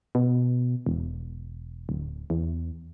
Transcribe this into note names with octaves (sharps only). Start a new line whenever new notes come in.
B2
E1
D1
E2